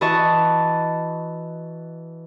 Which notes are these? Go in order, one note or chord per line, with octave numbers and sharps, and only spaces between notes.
E3 F#4 D#5 A5 C#6